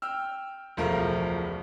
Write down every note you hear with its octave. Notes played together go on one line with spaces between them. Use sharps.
G5 E6 F6
E1 C#2 F3 A3 A#4